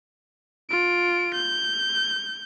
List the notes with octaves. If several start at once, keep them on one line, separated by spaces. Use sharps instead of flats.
F4 D7
G6